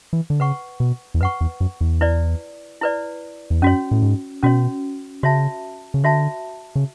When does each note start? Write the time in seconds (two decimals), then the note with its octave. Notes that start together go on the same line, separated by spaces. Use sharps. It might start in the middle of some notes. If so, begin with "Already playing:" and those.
0.13 E3
0.30 D3
0.40 C#3 B4 F#5 C#6
0.80 B2
1.14 E2
1.21 F#2 B4 F#5 C#6
1.41 E2
1.60 F#2
1.81 E2
2.01 E4 B4 D5
2.81 E4 B4 D5
3.50 E2
3.62 F#2 C#4 F#4 C#5
3.91 A2
4.02 G#2
4.43 B2 C#4 F#4 C#5
5.23 C#3 F#4 C#5 E5 A5
5.94 C#3
6.03 D3 F#4 C#5 E5 A5
6.75 C#3